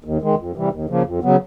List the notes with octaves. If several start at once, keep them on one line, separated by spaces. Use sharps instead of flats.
D#2
D#3 G#3
F2
C3 E3 G3
D#2
C#3 F3 A#3
F2
C#3 F#3 B3